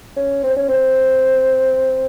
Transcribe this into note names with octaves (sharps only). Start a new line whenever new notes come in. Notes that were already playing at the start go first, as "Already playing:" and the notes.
C#4
C4
C#4
C4